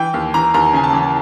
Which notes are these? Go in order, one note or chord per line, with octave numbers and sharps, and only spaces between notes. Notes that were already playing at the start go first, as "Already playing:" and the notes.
Already playing: E3 G5
D#2
E3 A#5
D#2 A#5
C#3 G#5
A5
E3